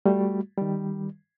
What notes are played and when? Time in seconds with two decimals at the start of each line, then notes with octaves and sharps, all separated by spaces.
0.06 G3 A3 F#4
0.58 D#3 G3